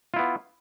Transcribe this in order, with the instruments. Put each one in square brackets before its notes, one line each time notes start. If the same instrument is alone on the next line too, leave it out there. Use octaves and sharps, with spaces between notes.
[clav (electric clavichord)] F4
E4
B3